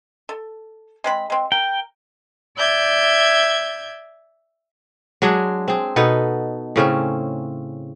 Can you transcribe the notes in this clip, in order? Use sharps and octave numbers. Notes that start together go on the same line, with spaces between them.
A4
G#3 C4 B5
G#3 C4
A#4 G5
D5 E5 G6 G#6
F#3 G#3 D4 G#4
C4 G#4
B2 B3 D#4 A4
A2 C#3 C4 C#4